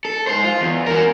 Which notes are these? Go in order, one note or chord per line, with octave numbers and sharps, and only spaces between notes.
A4
G#3 C5
F4
E2
F#4 A#4